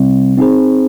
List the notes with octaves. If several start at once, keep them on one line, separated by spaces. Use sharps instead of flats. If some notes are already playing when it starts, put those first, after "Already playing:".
Already playing: C3 G3 C4
C4 D#4 G#4 C5